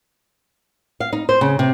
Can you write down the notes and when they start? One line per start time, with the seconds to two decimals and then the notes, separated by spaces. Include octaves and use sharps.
1.00 F5
1.13 D#4
1.29 C5
1.41 C#3
1.59 C3